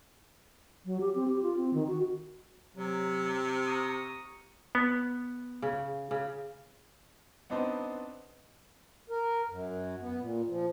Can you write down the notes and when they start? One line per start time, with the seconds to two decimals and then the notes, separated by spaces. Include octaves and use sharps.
0.86 F#3
1.01 G4
1.15 C4
1.28 G4
1.43 F4
1.57 C4
1.74 D#3
1.88 F#4
2.76 C3 F#3
3.66 A#5 C#6 D#6
4.75 B3
5.62 C#3
6.11 C#3
7.50 B3 C4 D4 D#4 B4 C5
9.10 A#4
9.49 F#2
10.01 B3
10.20 A#2
10.49 F3